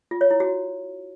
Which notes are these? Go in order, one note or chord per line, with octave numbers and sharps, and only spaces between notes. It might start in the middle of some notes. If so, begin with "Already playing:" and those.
F4
C#5
E4
F#4